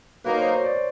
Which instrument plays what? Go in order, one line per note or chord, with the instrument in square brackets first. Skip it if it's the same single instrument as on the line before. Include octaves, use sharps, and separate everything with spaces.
[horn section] F#3 A#3 D#4 [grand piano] B4
[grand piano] C5
C#5
D5